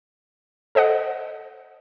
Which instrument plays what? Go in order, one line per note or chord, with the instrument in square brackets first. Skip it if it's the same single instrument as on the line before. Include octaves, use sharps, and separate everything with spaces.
[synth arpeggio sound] A4 C5 D#5 F#5